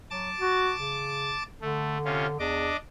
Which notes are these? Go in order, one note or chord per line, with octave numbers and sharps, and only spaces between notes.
F#3 A5 D6 A6
F#4
C#3
D3 A3
C3 C#4 F4
E2 D4 D#5 D6